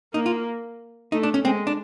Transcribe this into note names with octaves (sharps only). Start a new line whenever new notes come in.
A#3 D#4
F4
A3 D#4
D4
C#4
G#3 C4
D4